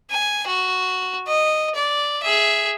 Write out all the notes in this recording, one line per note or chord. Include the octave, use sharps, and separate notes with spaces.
G#5
F#4
D#5
D5
G#4 E5